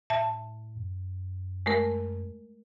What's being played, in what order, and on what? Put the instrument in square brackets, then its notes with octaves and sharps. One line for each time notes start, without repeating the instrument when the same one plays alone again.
[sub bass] A2 [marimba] E5 A5
[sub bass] F#2
[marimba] G#3 A3 A#4